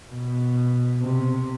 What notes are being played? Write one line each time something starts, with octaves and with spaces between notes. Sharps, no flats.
B2
C3